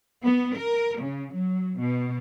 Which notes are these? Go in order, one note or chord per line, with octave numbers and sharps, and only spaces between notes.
B3
A#4
C#3
F#3
B2